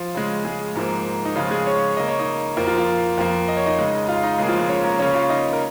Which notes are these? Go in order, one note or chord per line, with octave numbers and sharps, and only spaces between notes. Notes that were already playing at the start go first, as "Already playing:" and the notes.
Already playing: F3 F4
C#3 G#3
G#3 G#4
G#2 F3 A#3
D#4
C#3 F3 G#3 F4
G#3 G#4
C#4 C#5
C#3 A#3 D#5
C#5
D#4 D#5
F2 F3 A#3 A#4
F3 F4
F3 F4
F2 F3 A#3
D#5
C#5
D#4 D#5
C#3 G#3
F4 F5
D#4 D#5
C#3 G#3 A#3 G#4
F3 F4
G#3 G#4
C#4 C#5
A#3 A#4
C#3 A#3 C#4 C#5
F4 F5
D#4 D#5
A#4